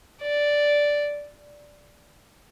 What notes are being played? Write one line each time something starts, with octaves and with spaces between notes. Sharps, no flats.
D5